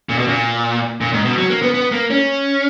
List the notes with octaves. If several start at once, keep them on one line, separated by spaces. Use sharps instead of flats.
A#2
B2
A#2
A#2
G#2
B2
F#3
A#3
B3
B3
A#3
C#4